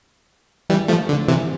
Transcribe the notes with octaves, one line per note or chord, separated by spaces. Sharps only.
E3 G3
F3 A3
D3
C3 E3